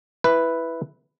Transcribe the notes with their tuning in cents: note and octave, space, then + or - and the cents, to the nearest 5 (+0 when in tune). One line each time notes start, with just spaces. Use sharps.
E4 +0 B4 +0